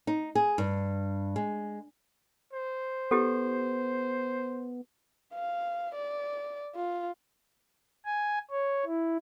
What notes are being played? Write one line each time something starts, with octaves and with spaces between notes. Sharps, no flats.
D#4
G#4
G2
G#3
C5
B3 E4 G4 A4
F5
D5
F4
G#5
C#5
E4